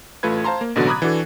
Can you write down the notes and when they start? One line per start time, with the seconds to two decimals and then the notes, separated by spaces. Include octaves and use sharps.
0.23 A1 A3 F4 B4 G#6
0.44 C5 F5 A5 A#5 C6
0.61 A#3
0.76 A1 B2 D3 F#3 F#4 A6
0.87 A#5 B5 D6 D#6 F#6 G#6
1.02 E3 D4 F#4 A4